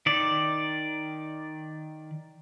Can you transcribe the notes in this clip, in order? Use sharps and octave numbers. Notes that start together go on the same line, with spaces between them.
D#3 D5